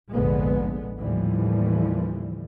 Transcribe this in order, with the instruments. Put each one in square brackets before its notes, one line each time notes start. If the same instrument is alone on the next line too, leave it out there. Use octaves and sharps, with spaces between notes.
[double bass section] F1 A#1 G#2 D3 G#3 B3
D#2 A2 D3 E3 F3 G3